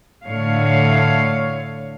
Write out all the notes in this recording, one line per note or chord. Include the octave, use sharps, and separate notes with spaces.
A2 D3 A3 C#5 F5